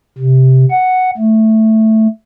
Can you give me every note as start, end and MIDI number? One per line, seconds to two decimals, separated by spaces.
0.18 0.65 48
0.70 1.10 78
1.17 2.07 57